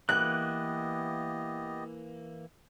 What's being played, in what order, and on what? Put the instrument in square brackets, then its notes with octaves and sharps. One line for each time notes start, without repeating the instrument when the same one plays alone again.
[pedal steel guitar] E3 A#3 [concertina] B3 G4 D#5 [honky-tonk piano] F#6